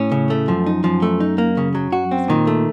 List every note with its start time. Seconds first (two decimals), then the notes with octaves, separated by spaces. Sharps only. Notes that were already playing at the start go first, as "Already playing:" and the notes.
Already playing: A2 C#4
0.12 C#3
0.30 A3
0.48 F#2 F3
0.66 D#4
0.84 F#2 F3
1.02 A3
1.20 D#4
1.38 A#3
1.57 C#3
1.75 F#3
1.93 F#4
2.11 C4
2.28 A#2 D#3
2.47 A3